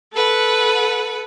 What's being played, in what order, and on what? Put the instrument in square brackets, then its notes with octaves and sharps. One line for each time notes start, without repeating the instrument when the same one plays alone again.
[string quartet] A4 B4 F#5